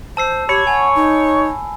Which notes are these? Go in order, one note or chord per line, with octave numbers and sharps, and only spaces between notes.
C5 A5 E6 C7
G4 C#5 B5
F#5 G#5
D#4